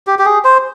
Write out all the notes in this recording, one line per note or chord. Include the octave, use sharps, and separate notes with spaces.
G4
G4
G#4
C5